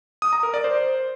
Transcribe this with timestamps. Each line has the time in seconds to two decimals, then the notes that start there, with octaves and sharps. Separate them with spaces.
0.22 D#6
0.33 A#5
0.43 A#4
0.54 D5
0.64 C5